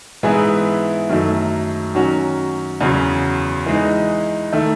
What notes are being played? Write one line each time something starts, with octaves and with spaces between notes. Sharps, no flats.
G#2 E3 B3 E4 G#4
F#2 D#3 F#3 A3
D#3 F#3 C#4 F#4
E2 C#3 F#3 C#4
E3 G#3 D#4
D#3 A3